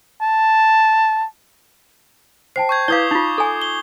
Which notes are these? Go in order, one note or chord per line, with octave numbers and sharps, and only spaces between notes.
A5
C5 G5 A5 C7
C#6 G6 G#6
E4 B4 C#5 F5 D6 D#6 G7
D#4 F4 A6
A4 G#5
G7